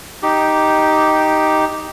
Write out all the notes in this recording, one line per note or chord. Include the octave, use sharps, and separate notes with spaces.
D#4 G4